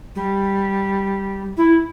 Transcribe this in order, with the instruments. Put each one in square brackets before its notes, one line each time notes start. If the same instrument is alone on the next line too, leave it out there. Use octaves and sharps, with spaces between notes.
[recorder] G3
E4